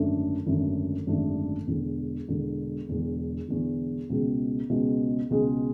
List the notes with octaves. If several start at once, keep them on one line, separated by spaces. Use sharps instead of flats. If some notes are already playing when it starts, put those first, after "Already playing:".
Already playing: G#1 F#2 D3 A3 D4
G#1 F#2 D3 A3 D4
G#1 F#2 D3 A3 D4
E1 E2 D3
E1 E2 D3
E1 E2 D3
E1 E2 D3
C#2 B2 G#3
C#2 B2 G#3
C#2 B2 G#3